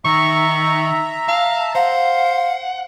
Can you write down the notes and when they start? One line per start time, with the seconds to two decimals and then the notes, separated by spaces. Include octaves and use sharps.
0.05 D#3 E5 A#5 C#6
1.28 F5 A5
1.75 C5 F5 F#5